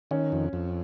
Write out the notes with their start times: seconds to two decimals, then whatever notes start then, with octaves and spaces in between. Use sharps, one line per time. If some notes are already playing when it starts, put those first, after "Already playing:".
0.11 D#3 C#4
0.32 F2
0.53 F2